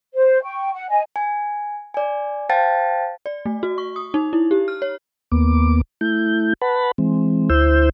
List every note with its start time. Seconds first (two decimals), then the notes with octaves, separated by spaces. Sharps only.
0.14 C5
0.43 G5 C#6
0.74 F#5
0.89 D#5 G#5
1.16 G#5
1.94 D5 G#5
2.49 C5 F5 G5 A5 A6
3.26 D5
3.46 A3
3.63 F#4
3.78 C#6
3.96 D#6
4.14 D#4
4.33 E4
4.51 G4
4.68 F6
4.82 C#5
5.32 D#2 A#3 B3 D6
6.01 A3 E4 G6
6.61 B4 F#5 A5 B5
6.98 E3 G#3 C4
7.50 D2 E4 C5 E6 G6